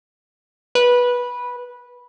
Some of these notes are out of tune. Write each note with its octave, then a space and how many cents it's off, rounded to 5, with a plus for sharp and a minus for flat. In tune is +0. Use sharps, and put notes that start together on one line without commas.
B4 -15